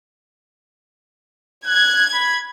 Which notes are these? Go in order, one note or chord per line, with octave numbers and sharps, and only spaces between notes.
F#6 G#6
B5